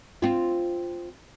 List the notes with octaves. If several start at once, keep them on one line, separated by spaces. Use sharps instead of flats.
C4 F4